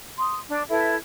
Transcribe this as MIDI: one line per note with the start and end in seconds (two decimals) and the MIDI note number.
0.19 0.37 84
0.19 0.37 87
0.49 0.62 62
0.69 0.95 64
0.69 0.95 69
0.69 0.95 71
0.69 0.95 76